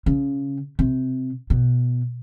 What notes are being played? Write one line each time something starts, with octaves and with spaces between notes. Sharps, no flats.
C#3
C3
B2